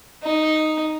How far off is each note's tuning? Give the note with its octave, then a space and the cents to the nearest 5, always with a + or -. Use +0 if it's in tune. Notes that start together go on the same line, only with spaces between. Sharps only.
D#4 +0